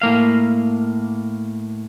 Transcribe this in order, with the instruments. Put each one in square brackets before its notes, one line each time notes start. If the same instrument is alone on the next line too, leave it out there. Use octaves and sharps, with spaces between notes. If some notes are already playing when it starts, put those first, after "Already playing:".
[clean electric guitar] A2 A#3 F5